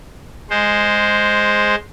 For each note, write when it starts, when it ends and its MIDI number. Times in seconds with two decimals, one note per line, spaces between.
0.50 1.75 56
0.50 1.75 72